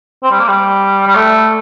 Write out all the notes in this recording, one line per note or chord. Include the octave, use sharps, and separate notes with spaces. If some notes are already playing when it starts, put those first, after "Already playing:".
C4
G3
A#3
G3
G3
A3